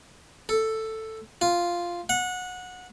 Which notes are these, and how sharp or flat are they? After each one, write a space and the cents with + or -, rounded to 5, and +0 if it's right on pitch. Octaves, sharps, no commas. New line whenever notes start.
A4 +5
F4 -5
F#5 -20